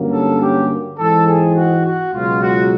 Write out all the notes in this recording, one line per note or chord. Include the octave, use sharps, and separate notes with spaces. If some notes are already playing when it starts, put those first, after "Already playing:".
Already playing: G2 D3 F#3 A#3 C#4
A4
G4
G#2 E3 G#3 C4 A4
G#4
F#4
F#4
C#2 B2 F#3 F4
F#4